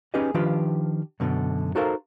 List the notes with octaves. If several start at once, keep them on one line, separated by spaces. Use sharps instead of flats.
C#4 D#4 G4 G#4 B4 D#5
D#3 F3 D4 F4 G4 B4
F#2 B2 D3
D#4 F#4 A4 A#4 C5 F5